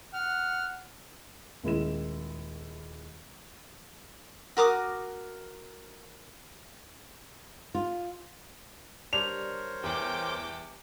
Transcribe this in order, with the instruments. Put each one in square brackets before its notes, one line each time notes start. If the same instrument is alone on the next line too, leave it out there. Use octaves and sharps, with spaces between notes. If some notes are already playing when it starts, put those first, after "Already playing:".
[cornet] F#5 [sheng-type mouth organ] F6
[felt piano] D#1 G#3 E4 E7
[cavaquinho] F#4 A#4 D6 D#6
[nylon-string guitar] F4
[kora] G3 D4 G4 [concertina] A#4 C5 C#5 [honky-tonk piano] F7
[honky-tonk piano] E2 [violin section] G5 D6